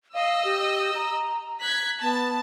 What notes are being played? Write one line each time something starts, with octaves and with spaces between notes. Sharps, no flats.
D#5 F5 E6
G4
A#5
F#6 G#6 B6
B3 A5